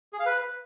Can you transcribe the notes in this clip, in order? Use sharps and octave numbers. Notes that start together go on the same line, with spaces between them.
G#4
F5
B4